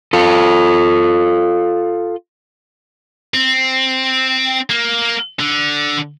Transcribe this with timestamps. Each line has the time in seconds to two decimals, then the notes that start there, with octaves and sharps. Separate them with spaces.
0.13 F4 A4
3.34 C4
4.70 A#3
5.40 D3